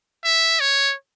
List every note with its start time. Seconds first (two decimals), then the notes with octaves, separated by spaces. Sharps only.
0.24 E5
0.60 C#5